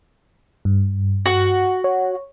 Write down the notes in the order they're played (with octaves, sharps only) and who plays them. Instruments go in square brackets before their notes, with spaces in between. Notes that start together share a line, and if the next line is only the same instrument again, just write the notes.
[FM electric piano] G2
[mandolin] F#4
[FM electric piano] C#5